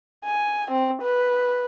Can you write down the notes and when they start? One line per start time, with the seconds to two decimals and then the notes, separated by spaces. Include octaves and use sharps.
0.25 G#5
0.71 C4
1.02 B4